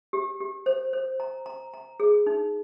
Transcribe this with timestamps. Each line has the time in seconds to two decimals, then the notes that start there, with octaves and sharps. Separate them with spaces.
0.13 G4
0.40 G4
0.66 C5
0.93 C5
1.20 A#5
1.46 A#5
1.74 A#5
2.00 G#4
2.27 D#4